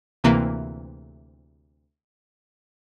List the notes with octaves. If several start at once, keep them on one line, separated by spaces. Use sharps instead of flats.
D2 C3 E3 A#3